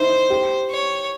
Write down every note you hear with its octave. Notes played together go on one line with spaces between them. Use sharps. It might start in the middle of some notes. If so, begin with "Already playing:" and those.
Already playing: D#4 E4 C5
G4
C#5